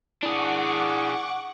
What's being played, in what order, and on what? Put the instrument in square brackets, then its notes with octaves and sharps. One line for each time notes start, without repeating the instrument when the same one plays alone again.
[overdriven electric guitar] D4 G#4 [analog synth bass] E4 [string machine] F#5 C#6 D6